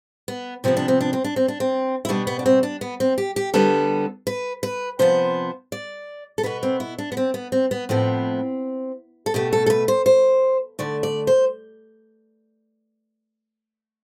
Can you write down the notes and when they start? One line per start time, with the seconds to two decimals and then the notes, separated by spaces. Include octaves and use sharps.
0.28 B3
0.64 C3 F3 B3 C4
0.77 D4
0.88 C4
1.01 D4
1.13 C4
1.24 D4
1.36 C4
1.48 D4
1.60 C4
2.05 E4
2.09 B2 G3 B3 D4
2.27 B3
2.39 D4
2.46 C4
2.63 D4
2.81 B3
3.00 C4
3.18 G4
3.36 G4
3.54 D3 G3 B3 A4
4.27 B4
4.63 B4
4.99 C3 F3 B3 C5
5.72 D5
6.38 A4
6.43 B2 B3 B4
6.63 C4
6.80 E4
6.98 D4
7.12 B3
7.17 C4
7.34 B3
7.52 C4
7.71 B3
7.89 A2 F3 B3 C4
9.26 A4
9.34 B2 A3 G4
9.53 A4
9.66 A4
9.70 B4
9.88 C5
10.06 C5
10.79 D3 A3 D5
11.03 D5
11.27 C5